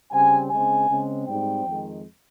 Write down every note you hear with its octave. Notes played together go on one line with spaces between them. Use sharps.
C#3 G3 C4 G#5
C#3 G#3 C4 G#5
C#3 G#3 C4
G#2 G3 C4 G5
F2 D#3 G#3